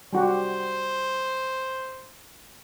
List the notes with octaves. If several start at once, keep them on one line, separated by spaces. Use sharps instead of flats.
G3 F#4 G4 C5